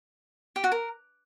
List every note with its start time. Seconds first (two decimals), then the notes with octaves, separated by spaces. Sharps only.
0.56 G4
0.64 F#4
0.72 A#4